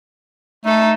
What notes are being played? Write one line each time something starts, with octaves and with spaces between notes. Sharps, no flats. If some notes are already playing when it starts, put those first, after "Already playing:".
A3 D#4 A4